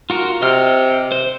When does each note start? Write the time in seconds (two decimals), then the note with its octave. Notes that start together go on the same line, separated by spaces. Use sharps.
0.10 F4 F#4 A#4
0.42 C3 D#5 F6
1.12 C5